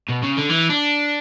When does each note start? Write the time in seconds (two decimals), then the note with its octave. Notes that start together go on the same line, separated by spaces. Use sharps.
0.09 B2
0.23 C#3
0.37 D3
0.49 E3
0.69 D4